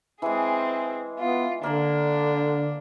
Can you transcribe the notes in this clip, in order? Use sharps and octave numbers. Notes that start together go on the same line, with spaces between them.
E3 G#3 C4 G#4
B3 F4
D3 A#3 D4 D5